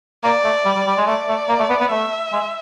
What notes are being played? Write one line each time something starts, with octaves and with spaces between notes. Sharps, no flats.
A#3 D5
A3
G3
G3
G3
G#3
A3 D5
A3
A#3
A3
B3
B3
A3 E5
G#3